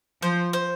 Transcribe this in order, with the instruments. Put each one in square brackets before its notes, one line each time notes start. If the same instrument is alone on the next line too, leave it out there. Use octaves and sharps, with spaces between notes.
[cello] F3 [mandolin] C5
[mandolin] C5